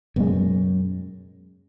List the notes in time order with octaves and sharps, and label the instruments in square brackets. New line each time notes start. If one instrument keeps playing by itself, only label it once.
[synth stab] C#2 B2 G#3 [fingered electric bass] F#2